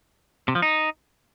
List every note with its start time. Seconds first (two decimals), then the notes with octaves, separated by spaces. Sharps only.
0.48 C3
0.55 F3
0.62 D#4